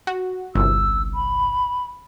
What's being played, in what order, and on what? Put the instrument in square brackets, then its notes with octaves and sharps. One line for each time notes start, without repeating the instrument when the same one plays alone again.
[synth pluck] F#4
[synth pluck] G1 C2 [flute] E6
[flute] B5